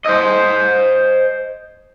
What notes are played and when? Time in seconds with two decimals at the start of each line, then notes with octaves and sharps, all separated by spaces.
0.05 C5 D#5